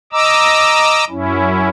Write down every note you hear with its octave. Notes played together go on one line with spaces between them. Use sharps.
D#5 A#5 D6 E6
F#2 C#4 E4